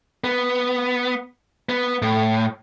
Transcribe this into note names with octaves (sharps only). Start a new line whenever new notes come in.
B3
B3
A2